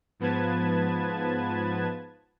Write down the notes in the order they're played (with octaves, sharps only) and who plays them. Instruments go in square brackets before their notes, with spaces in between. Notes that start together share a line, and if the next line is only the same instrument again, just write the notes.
[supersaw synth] G#2 F3 B3 B4 A5 G#6